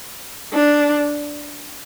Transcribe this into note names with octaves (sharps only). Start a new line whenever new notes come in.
D4